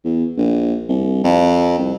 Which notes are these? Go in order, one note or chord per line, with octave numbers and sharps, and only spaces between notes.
E2
A#1
C2
F2
C2